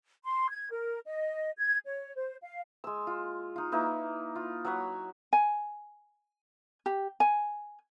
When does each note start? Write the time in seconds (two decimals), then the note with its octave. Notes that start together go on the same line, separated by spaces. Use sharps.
0.24 C6
0.49 G#6
0.71 A#4
1.06 D#5
1.58 G#6
1.86 C#5
2.16 C5
2.42 F5
2.84 G#3 E6
3.07 F4
3.56 D#4 F4
3.72 A#3 D#4 E4 B4
4.36 F4
4.65 F#3 C#5 F#5 B5
5.33 G#5
6.86 G4
7.20 G#5